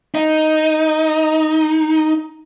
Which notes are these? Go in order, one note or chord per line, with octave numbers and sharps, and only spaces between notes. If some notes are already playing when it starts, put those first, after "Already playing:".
D#4